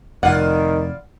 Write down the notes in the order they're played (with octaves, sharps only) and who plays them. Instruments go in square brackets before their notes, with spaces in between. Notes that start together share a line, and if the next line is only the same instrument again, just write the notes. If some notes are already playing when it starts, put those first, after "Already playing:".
[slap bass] F1 F2 [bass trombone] D#3 [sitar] E4 F4 D5 [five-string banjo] F#5